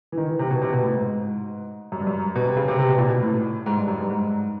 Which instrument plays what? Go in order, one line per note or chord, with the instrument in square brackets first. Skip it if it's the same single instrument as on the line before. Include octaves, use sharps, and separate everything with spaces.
[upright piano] E3
D#3
E3
C3
B2
C3
B2
A2
G#2
F#2
G2
F#2
B2
C3
C#3
C3
C3
B2
A#2
B2
A2
G#2
G2
F#2
G2
G#2